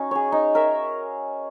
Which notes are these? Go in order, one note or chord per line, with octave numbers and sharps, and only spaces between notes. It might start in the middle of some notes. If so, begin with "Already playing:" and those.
Already playing: C#4 D#4 F#4
G#4 C#5
D#4
A#4 E5